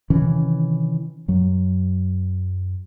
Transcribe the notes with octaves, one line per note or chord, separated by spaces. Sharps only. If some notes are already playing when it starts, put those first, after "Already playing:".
C3 D#3 E3 C#4
F#2 F#3